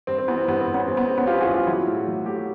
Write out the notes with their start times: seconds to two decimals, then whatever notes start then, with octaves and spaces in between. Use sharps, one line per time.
0.07 G2 C4
0.18 C4
0.28 E3 B3
0.38 C4
0.48 G2 B3
0.61 C4
0.68 G2
0.74 B3 C#4
0.87 G2 C4
0.97 B3
1.08 G#3 C4
1.17 B3 C#4
1.27 E3 F4 G4
1.40 F#4 G#4
1.47 G2
1.54 F4 G4
1.67 F#3 E4 F#4
1.87 A2
2.07 F#3
2.26 A3 G4
2.36 F#4